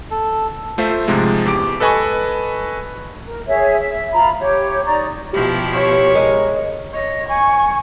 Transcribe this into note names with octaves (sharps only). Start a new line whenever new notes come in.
A4
A3 F4 C5 E5
G#2 C3 F3 G#3
E2 G4 D6 D7
A4 B4 D#5 G#5 B5 C#6
A#4
G#4 C#5 E5
E5
F4 A#5 B5
G4 C#5
D#4 D5 A#5 C#6
B2 F3 E4 G4
C#5
G#3 A#4
C#5 D#5
G#5 C#6